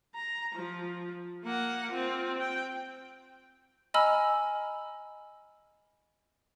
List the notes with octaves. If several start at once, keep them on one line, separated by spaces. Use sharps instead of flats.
A#5
F3
A#3 F#5
C4 F4
G5
D#5 G#5 A#5 B5 E6 F6